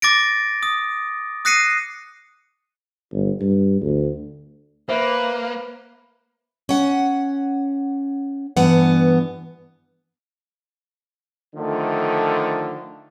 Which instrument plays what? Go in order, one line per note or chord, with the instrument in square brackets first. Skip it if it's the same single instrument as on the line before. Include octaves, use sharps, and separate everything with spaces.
[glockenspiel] D6 A6 A#6 D7
D#6
D#6 F#6 A#6 C7 C#7 D#7
[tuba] G1
G2
D2
[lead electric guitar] A#3 [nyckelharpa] B4 [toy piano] C5 E5
[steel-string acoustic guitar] C#4 F#5
G2 E3 B3 F#5
[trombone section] D3 D#3 F3 A3